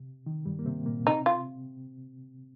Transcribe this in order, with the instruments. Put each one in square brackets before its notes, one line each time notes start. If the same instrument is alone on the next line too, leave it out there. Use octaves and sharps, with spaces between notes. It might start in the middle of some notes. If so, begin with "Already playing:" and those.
Already playing: [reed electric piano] C3
D#3
G2 G3
A#3
C3 C4
A#2 A#3
[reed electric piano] C3 C4 [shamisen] D#4
[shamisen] F4